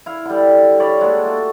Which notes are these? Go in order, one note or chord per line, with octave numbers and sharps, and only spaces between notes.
E4 F5
D3 G3
C#5 D5 B5
G#3 A#3 F#4 A4
A3